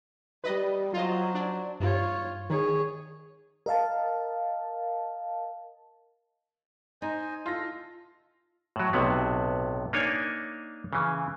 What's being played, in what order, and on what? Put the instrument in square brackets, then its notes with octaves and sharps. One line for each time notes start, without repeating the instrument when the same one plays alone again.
[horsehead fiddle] G3 [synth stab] B4 D#5
[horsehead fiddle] F#3 C5 [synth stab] F4 D#5
[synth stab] D4
[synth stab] G2 [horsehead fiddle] F4 C#5
[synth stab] D#3 [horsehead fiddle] G#4 C#5
[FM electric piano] A#4 D#5 F5 A5
[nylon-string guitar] D#4 [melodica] C5 D#5 G#5
[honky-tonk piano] F4 A#6 [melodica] A4
[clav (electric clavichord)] A2 F#3
B1 A2 C3 B3
A#3 D4 D#4 C#5 G#5
C#3 E3